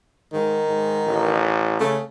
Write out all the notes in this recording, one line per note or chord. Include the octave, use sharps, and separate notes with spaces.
G#2 D#3
G#2
A1
C#3 A3